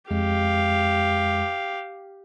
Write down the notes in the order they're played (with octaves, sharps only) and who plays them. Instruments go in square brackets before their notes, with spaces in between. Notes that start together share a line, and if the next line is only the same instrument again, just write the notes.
[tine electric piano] F2 G#3 [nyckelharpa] G4 F5